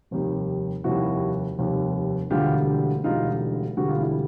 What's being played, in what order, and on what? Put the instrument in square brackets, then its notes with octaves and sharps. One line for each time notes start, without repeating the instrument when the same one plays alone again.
[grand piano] F1 D#2 D#3 G3
F1 D#2 D#3 G3 E4 F#4
F1 D#2 D#3 G3
E1 D2 D3 G3 F4 G4
E1 D2 D3 G3 D#4 F4
E1 D2 D3 G3 F#4
F4
E4